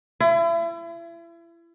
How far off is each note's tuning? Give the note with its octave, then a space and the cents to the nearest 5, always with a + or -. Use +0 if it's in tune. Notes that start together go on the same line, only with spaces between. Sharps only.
E4 +35